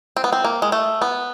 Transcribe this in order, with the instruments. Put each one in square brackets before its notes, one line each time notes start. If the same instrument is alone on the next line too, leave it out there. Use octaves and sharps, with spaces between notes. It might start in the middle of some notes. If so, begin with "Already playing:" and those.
[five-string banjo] C4
B3
C4
A#3
G#3
A3
B3